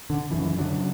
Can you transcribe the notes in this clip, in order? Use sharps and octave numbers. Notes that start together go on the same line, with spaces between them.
D3
F#2 C#3 E3
E3
D3 F#3
C#3